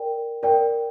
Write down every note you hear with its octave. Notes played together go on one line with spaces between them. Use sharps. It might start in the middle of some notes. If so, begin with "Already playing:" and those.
Already playing: A#4 D5 G5
A#4 D5 G5